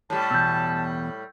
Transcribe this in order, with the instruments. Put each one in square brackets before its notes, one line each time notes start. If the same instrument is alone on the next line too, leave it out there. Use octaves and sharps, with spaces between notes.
[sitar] A2 G3 [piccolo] A5
[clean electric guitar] E2 B2 [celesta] E6 G6